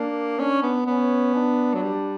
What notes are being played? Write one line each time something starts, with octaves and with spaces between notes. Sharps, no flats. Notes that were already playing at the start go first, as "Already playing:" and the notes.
Already playing: A#3 D4
C#4 D4
B3
B3 C#4
D4
F#3
G3